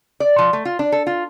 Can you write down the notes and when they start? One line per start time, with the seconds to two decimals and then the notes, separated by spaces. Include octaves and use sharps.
0.20 D5
0.38 F3
0.53 A3
0.65 F4
0.79 D4
0.92 A4
1.07 F4